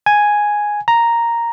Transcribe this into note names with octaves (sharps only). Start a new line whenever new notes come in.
G#5
A#5